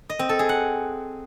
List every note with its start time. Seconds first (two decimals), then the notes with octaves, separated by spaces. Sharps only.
0.09 D#5
0.19 C4
0.29 A4
0.39 G#4
0.49 F#5